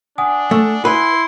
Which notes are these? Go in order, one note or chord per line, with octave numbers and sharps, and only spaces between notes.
D4 F#5 G#5 D#6
A3
E4 B4 C6